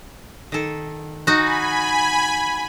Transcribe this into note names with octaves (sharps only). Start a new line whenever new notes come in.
D#3 A4
D#4 F#4 G#5 B5